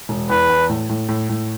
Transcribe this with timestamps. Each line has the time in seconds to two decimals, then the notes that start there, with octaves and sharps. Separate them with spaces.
0.09 E1
0.30 E2 B4
0.50 E2
0.69 A2
0.89 A2
1.09 A2
1.29 A2